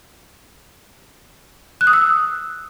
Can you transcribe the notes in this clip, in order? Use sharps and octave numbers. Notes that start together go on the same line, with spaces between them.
F#6
D#6
E6